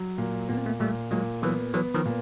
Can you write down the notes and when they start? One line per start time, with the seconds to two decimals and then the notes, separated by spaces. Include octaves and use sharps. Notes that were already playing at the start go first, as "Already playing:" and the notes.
Already playing: F#3
0.18 A#2
0.49 A#2 B3
0.57 C4
0.66 A3 B3
0.80 A#2 G3 A3
1.11 A#2 F#3 G#3
1.42 E3 F#3 B3
1.74 E3 F#3 B3
1.94 D#3 F3
2.05 A#2